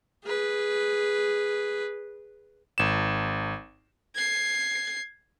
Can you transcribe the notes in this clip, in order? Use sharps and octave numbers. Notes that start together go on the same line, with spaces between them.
G#4 B4
G#1 E7
G#6 C7